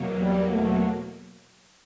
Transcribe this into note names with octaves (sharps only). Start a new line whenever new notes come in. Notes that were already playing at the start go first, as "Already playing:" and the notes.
Already playing: E2 B2 F#3 A#3
G3
A3